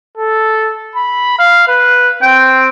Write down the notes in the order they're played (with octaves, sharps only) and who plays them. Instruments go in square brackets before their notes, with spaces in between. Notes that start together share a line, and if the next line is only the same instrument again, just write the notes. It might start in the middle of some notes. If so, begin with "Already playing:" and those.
[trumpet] A4
B5
F5
B4
[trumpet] C4 [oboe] G5